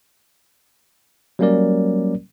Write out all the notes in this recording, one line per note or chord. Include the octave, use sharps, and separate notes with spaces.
F#3 G3 A#3 C#4 A#4 D5